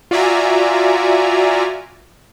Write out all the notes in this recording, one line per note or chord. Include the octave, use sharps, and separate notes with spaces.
F4 F#4 D5 E5 G#5 A#5